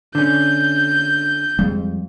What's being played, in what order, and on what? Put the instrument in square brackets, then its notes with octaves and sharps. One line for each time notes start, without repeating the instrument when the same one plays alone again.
[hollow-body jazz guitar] D3 C#4 [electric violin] G6
[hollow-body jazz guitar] F2 [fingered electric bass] G3 G#3